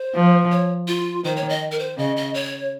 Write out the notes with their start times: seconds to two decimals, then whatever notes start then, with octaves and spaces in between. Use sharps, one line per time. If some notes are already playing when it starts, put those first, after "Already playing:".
Already playing: C5
0.15 F3
0.51 C#5
0.88 F4
1.24 D#3 C5
1.36 C#5
1.49 D#5
1.72 A#4
1.79 C5
1.98 C#3 D#5
2.17 D#5
2.34 C#5